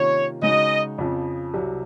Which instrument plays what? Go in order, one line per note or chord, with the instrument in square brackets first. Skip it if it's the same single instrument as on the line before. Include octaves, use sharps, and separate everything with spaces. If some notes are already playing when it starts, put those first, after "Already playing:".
Already playing: [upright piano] C3 D#3 A#3 C#4 F4 [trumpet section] C#5
[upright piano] C#3 G#3 D#4 F#4 [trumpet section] D#5
[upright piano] F2 C#3 F3
C2 C3 F#3